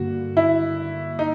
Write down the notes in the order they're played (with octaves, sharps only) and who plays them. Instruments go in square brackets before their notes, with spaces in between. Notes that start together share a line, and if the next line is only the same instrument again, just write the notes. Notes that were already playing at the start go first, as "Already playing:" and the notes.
Already playing: [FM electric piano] G2 D3 G3 A#3 [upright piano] F#4
[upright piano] E4
D#4